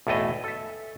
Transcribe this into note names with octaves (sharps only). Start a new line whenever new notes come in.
B1 E2 A2 A3 D#5
A4 E5